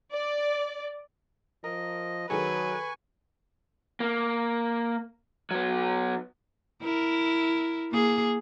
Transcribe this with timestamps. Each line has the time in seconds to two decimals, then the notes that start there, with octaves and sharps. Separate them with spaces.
0.12 D5
1.64 F3 A#4 D#5
2.30 D#3 F#3 G#4 A4 B4 G#5 C#6
4.00 A#3
5.51 F#3 B3
6.82 E4 A#4
7.91 A#3 G#4